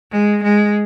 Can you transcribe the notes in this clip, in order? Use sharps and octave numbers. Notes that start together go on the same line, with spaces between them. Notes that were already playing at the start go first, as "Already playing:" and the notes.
G#3
G#3